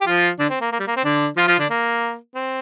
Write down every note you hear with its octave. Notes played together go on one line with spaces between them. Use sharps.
G4
F3 F4
D3 D4
C4
A#3
A#3
G3
A#3
C4
D3 D4
F3 F4
F3 F4
D3 D4
A#3
C4